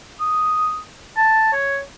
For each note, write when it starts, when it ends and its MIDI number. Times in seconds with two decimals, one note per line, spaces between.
0.20 0.79 87
1.17 1.48 81
1.53 1.78 73